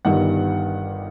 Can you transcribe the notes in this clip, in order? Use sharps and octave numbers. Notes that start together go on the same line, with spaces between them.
G1 G2 D#3 G3 F#5